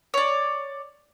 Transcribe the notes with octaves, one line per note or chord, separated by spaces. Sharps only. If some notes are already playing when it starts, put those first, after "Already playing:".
C#5 D5